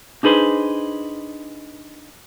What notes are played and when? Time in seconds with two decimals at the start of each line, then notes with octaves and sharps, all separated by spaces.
0.23 D4 D#4 G#4 B4 C5